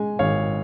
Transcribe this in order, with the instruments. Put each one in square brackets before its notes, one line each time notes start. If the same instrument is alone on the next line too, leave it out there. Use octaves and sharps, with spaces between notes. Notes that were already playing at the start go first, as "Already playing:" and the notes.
Already playing: [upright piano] G#3 [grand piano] G#5
[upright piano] G#1 [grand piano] C#5 F5